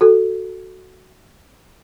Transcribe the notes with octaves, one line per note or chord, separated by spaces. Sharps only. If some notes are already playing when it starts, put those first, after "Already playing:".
F#4 A4